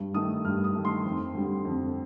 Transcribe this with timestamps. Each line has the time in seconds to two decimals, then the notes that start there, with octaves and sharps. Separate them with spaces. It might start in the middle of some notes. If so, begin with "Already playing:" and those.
Already playing: G2
0.14 D#3 A3 D#6
0.44 G2 F6
0.64 D#6
0.75 D#3 A3
0.85 C6
1.05 F2
1.35 D3 G3
1.65 F2